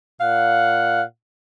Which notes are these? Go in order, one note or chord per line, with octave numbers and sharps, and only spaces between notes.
A#2 F5 F#5